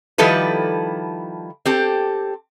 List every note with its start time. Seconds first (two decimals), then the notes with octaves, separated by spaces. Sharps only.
0.18 D#3 F3 G3 E4 A4 B4
1.65 C4 G4 A4